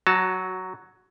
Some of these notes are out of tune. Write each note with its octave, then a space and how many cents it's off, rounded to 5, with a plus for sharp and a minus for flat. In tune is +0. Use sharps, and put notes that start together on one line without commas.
F#3 +5 F#4 -15 A5 +5